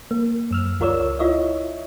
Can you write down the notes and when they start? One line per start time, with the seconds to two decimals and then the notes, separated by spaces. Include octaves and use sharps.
0.11 A#3
0.51 F#2 E6 F6
0.80 C#2 F4 A#4 C#5 D5 E6
1.19 E4 F4 C#5 D#5 E5